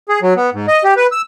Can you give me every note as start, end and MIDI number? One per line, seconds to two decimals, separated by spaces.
0.09 0.20 68
0.22 0.34 54
0.37 0.50 59
0.53 0.66 44
0.68 0.83 75
0.84 0.94 67
0.96 1.07 71
1.12 1.22 88